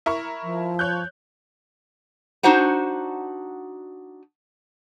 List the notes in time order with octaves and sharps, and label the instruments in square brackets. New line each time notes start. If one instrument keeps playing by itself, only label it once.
[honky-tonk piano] E4 A#4 C#6
[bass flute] F3
[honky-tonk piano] C#5 F#6 G6
[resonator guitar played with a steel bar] D4 D#4 F#4 C5 F#5 A#5